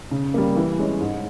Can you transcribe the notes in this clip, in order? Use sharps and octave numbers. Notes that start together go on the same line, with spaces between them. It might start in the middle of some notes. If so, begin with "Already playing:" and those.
C#3
G3 A#3
E3
G#3 C#4
G#2